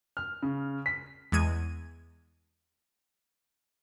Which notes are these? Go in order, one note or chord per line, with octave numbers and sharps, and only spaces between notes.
F6
C#3
B6
E2 G#3 G#6 D#7